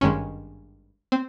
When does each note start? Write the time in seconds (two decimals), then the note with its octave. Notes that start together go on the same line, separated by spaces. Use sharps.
0.01 G#1 G2 D#3 G#3 C#4
1.12 C4